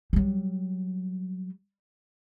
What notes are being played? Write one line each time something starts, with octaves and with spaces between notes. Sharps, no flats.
F#3 G3